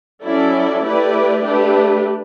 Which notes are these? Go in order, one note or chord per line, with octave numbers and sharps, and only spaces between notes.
F#3 C#4 E4 A4 D5
A3 E4 G4 B4 D5
A3 D4 G4 B4